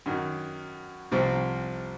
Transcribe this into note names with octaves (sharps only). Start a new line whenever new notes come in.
F#2 D#3 F#3
C2 C3 F3 C4